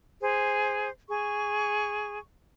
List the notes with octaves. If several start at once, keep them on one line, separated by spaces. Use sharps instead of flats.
G#4 C5
G#4 C#6